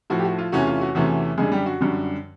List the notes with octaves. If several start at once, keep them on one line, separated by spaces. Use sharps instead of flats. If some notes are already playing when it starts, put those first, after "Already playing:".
A2 F3 A3 F#4
G4
F#4
F4
E2 C3 E3 A3 C#4 F#4
F4
F#4
E2 C3 E3 A3 C#4
F#2 D3 G3 G#3 G#4
G3 G4
F#4
F#2 D3 G3